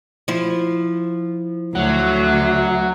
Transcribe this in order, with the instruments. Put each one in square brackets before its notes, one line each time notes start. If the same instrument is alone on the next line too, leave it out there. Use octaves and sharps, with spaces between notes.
[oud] F3 E4
[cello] D2 [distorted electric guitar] F#3